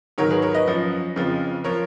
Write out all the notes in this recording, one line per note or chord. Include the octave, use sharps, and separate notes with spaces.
G#2 D#3 F#3 A#4 C#5
G#4 B4
A#4 C#5
B4 D#5
F#2 F3
F2 C#3 F3
F3 A#4 C#5